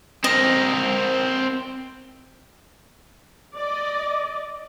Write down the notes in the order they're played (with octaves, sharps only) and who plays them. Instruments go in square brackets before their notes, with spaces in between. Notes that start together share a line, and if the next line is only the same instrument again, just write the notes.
[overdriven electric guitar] C4 A#4 [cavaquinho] D#5
[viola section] D5 D#5